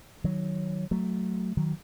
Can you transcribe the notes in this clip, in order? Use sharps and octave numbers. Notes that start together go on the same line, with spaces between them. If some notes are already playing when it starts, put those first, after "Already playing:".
D#3 F#3
F#3 A3
D#3 F#3